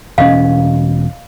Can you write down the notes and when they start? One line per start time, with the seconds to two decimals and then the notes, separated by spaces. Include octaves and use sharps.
0.18 E1 C#4 D#5 F5